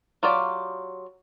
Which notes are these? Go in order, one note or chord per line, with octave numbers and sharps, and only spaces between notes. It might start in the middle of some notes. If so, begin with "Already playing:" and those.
F#3 F4 G4 D5